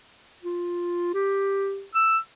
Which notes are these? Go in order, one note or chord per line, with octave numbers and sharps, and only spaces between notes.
F4
G4
E6